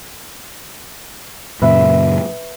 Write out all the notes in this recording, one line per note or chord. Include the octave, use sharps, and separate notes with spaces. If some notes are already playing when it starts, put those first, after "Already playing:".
F#2 A#2 C#3 B4 E5